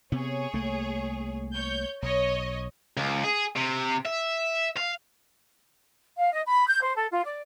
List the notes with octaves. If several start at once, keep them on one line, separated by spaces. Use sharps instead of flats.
C3 B3 G#4 C#5
C2 A3 A#3
C#5 G6
B1 C#5 D#5
C#2
G#4
C3
E5
F5
F5
D#5
B5
G6
C5
A4
F4
D5